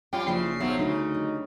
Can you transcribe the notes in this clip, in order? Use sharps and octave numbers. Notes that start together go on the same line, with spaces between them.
G3 C#4 F4 G5
F#1 C#3 F3 D4 E4 C7
B1 F3 F#3 E5
D2 C#3 D#4
G3